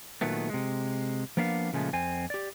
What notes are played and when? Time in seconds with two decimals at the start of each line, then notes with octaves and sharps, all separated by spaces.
0.21 A#2 D#3 F#3 A3 B3
0.50 C3 G#3
1.37 F3 A#3 B3 D4 F5
1.73 A#2 C#3 F3 G#3 A3
1.93 F2 C4 G#5
2.30 G4 D5